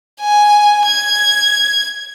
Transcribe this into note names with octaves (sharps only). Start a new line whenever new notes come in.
G#5
G#6